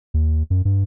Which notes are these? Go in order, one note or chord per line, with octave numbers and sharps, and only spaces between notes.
D#2
F#2
G2